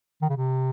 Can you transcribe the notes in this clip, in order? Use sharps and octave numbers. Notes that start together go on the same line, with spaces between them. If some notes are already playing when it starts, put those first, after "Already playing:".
D#3
C#3
C3